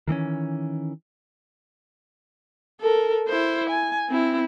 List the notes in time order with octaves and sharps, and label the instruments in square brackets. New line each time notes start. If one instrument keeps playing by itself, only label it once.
[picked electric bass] D#3 E3 A#3 C#4
[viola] A4 A#4
E4 C5
G#5
C4 E4